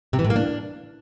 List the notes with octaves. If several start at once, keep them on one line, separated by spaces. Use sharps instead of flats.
C3
E3
A2
A#3
D4